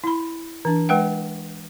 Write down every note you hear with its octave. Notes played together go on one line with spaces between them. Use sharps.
E4 B5
E3 D4
G#3 B4 F#5 G5